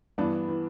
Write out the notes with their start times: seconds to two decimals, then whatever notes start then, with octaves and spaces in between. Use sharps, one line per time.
0.18 G2 E3 B3 D4
0.48 E3